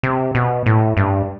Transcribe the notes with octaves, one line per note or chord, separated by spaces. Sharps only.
C3
B2
A2
G2